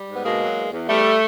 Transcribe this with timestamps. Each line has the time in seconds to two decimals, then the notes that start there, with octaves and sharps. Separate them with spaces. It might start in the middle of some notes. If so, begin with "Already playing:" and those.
Already playing: G3
0.08 G#2
0.16 B3
0.25 B2 G#3 A#3
0.41 F#3
0.57 E2
0.72 E2
0.88 E2 G3 A3